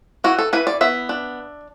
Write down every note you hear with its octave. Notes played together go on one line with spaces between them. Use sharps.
E3 F#4
A4
E3 B4
D5
B3 E5
D4